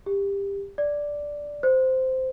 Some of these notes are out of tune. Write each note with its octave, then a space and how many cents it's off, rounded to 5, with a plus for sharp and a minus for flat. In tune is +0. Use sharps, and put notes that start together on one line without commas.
G4 +20
D5 -5
C5 -10